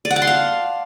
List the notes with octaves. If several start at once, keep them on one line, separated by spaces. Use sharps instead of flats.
D5
F#5
A5
C6
F5